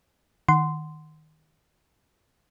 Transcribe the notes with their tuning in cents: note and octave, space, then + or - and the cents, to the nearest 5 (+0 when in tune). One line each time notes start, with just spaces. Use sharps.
D#3 +0 F#5 +0 C6 -15